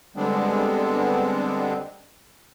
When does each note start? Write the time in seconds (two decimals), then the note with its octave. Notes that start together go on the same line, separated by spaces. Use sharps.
0.16 D3 G3 G#3 B3 C4 D4